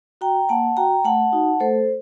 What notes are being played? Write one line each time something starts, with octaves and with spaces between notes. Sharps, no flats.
F#4 G5 A#5
A#3 F#5 A5
F#4 G5 A#5
A3 F#5 A5
D#4 F#4
A3 A4 C5